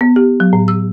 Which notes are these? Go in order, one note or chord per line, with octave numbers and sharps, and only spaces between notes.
B3
G4
F#3
A2
E6